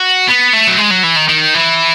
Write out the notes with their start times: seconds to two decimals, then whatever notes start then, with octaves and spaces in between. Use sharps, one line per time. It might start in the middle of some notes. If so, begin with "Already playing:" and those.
Already playing: F#4
0.28 B3
0.53 A3
0.67 F#3
0.77 G#3
0.91 F#3
1.03 E3
1.16 D#3
1.28 D#3
1.54 E3